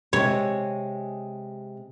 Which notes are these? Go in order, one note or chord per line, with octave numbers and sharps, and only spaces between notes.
C3 G#3 C#5